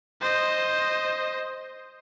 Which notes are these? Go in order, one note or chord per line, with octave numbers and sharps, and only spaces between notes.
C5 D#5